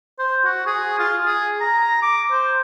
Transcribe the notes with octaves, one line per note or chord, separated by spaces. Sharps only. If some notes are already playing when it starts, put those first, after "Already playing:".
C5
F#4
G#4
F4
G#4
A#5
D6
C5